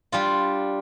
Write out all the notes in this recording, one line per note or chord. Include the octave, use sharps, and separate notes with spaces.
G3 D4 F4